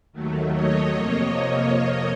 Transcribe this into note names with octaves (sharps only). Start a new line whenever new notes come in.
D#2 D#3 F#3 A3
C#5 D#5
F2 C3 F3 A#3